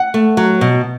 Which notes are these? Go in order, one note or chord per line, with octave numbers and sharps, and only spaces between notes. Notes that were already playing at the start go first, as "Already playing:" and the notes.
Already playing: F#5
A3
F#3
B2